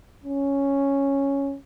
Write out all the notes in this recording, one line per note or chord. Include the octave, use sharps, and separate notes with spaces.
C#4